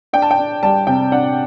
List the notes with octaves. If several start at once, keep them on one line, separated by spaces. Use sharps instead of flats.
D4 G5
A5
G5
D4
G3 A5
C3 G5
D4 F#5